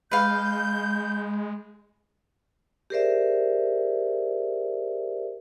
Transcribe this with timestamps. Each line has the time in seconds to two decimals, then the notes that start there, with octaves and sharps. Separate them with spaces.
0.11 G#3 B4 F5 G6
2.90 G4 G#4 A#4 C5 D5 E5